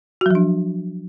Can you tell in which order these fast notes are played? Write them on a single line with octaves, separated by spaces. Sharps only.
F#4 F#3 F3 D4